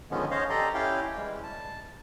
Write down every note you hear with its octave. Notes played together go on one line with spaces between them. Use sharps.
D3 D#3 F3 G#3 B3 C#4
C#4 C5 C#5 D#5 F5
G4 A4 D5 D#5 A#5 C6
C#4 E4 G4 F5 G5
E3 G3 G#3
A5